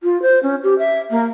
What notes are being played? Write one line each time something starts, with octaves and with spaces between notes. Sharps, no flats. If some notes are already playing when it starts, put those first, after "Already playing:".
F4
C5
C#4
G4
E5
A#3